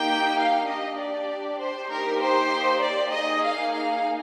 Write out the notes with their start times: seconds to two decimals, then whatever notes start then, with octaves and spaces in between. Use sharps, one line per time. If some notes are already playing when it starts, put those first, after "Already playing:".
Already playing: A#3 D#4 G4 G5
0.39 F5
0.68 D4 G4 D#5
0.99 D5
1.60 C5
1.90 A#3 D#4 G4 A#4
2.21 C5
2.82 D5
3.12 A#3 D#4 G#4 D#5
3.43 F5
3.73 F5